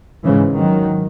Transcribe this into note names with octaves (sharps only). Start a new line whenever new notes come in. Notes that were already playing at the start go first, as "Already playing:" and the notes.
G#2 C#3 E3
D#3 F#3